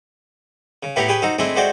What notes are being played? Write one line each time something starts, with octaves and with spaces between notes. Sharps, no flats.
C#3
A2 A3 B3 E4 G4 A#5
G4 G#4 B4 C#5 G5
D#4 F#4 A4 C5
G#3 A3 C4 D4 E4 G#4
G#3 A3 F#4 C5 D5 G5